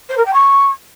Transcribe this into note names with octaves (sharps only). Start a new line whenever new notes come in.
C5
A#4
G5
C#6